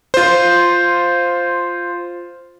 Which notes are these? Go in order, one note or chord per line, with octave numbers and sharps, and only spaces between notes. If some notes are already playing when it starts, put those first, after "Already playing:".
F4 C5